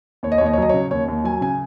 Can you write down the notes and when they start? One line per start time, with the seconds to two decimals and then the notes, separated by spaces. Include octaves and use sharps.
0.23 D#2 C#5
0.32 D#5
0.38 C#5
0.41 D#2
0.46 D#5
0.53 C#5
0.58 F#3 D#5
0.69 C#3 C#5
0.91 D#2 C#5
1.08 D#2
1.24 F#3 G#5
1.41 C#3 G#5